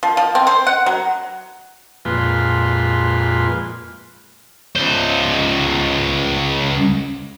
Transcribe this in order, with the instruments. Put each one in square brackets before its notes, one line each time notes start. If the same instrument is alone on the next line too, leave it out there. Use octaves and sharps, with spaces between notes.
[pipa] F3
F3
C4
C5
F#5
F#3
[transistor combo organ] F2 A#2 G#3 F4 B4 C6
[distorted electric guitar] C#2 C5